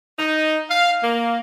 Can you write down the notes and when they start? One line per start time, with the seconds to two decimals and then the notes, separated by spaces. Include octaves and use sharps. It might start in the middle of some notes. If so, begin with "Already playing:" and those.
0.18 D#4
0.70 F5
1.02 A#3